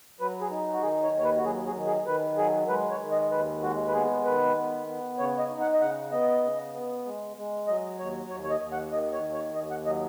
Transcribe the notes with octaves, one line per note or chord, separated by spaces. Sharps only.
F#3 B4
G#4
D#4
F#4
D#3 G#4
C#5
D#2 C#5
B4
F#4
F#3 G#4
G#4
D#3
G#4
D#3 B4
F#3 G#4
G#3 B4
C#5
D#3
D#5
D#2 B4
G#3 F#4
B4
B3 G#4
D#3 B4
B3
B3
C#3 C#5
D#5
D#4
F#5
D#5
C#3 F#5
B3 D#5
C#3
B3
G#3
G#3
F#3 D#5
D#2 C#5
D#2 C#5
C#5
D#5
D#2
F#5
D#3 D#5
C#5
D#2
C#5
D#2 D#5
F#5
F#3 D#5